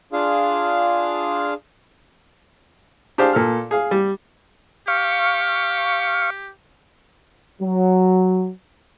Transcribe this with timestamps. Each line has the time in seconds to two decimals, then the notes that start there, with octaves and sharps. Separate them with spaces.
0.13 D4 F4 G#4 F5
3.18 D4 G4 G#4 C5 F5
3.33 A#2 A4 F6
3.71 G#4 F5
3.91 G3
4.88 G4 F5 C#6
7.62 F#3